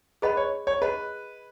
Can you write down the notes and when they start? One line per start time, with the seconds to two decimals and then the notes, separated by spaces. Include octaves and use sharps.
0.22 G#4 B4 D#5 F#5 B5
0.37 C#5
0.67 C#5
0.81 G#4 B4 D#5 F#5 B5